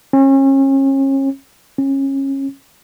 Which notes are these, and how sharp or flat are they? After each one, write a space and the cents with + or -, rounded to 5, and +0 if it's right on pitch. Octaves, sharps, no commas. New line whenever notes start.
C#4 -35
C#4 -25